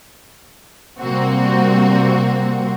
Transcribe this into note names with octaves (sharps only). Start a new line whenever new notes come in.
C3 G3 A#3 C4 F#4